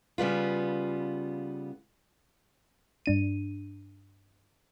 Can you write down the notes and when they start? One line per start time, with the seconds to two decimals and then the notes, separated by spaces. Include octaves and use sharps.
0.18 C#3 G3 B3 F4
3.06 G2 D4 D#7